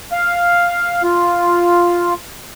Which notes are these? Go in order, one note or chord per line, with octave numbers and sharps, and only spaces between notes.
F5
F4